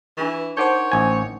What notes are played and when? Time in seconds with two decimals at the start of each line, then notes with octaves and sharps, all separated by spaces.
0.17 E3 D4 F4 C#6
0.57 D#4 A#4 C5 C#5 F#5 D6 G6
0.92 A1 G#5